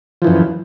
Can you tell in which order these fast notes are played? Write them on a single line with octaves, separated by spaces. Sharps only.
F3 E3 F#2